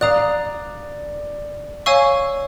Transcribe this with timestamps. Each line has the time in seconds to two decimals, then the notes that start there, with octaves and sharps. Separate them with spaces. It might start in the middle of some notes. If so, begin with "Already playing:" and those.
0.01 D5 F5 A#5 D#6 F#6
1.86 C#5 F5 G#5 C#6 E6